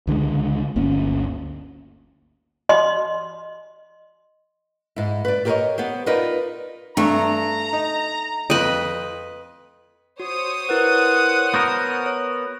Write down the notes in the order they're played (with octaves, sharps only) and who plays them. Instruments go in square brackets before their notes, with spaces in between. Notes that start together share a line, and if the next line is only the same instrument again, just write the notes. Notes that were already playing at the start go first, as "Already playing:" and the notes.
[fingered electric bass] C#2 D3 F3 G#3
G1 D2 A#3 C#4
[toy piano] D#5 C6
[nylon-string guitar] G#2 E4
B4 D5
G4 A4 A#4 C5 C#5 D#5
B3 G4 C5
D#4 F4 A#4 B4 D5 D#5
[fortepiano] G2 [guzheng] A3 [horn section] A#5
[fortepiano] D#4
[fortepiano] F2 G5 [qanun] B4 D#5
[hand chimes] F#4 [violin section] C5 C#5 D#6
[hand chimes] E4 A#4 B4 [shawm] F#5
[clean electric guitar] B3 F#4 A#4 [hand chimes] G6
[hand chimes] C#5